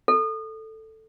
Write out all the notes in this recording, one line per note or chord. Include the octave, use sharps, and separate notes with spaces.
A4